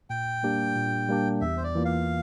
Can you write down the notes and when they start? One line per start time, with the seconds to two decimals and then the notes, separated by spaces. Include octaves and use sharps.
0.10 A#2 G5
0.43 G3 A#3 D4 G4
0.76 A#2
1.08 G3 A#3 D4 G4
1.41 E2 E5
1.57 C5
1.63 D5
1.75 E3 A#3 F4
1.85 F5